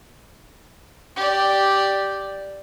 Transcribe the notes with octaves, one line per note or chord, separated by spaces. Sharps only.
G4 D5